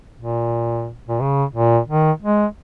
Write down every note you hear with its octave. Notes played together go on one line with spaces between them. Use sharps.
A#2
A#2
C#3
A#2
D#3
G#3